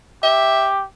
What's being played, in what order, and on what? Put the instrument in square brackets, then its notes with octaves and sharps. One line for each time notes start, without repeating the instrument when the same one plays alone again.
[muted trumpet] G4 [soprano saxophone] E5